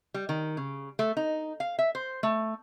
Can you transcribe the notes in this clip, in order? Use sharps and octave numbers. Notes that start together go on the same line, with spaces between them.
G3
D#3
C#3
A3
D#4
F5
E5
C5
A3